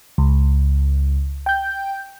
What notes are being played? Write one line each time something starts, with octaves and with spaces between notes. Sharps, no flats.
C#2
G5 G6